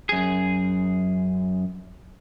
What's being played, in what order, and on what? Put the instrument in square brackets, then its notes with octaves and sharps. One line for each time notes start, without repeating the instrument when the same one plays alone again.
[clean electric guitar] F#2 G#4